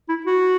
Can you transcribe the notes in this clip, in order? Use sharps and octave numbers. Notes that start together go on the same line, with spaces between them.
E4
F#4